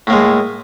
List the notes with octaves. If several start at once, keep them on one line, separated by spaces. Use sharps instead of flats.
A2 G#3 A#3